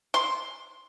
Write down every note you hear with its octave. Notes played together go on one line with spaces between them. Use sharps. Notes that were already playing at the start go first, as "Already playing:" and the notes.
C6